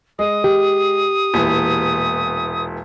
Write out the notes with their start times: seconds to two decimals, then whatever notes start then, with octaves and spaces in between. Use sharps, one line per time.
0.19 G#3 D#6
0.44 G4
1.34 E1 A#2 E3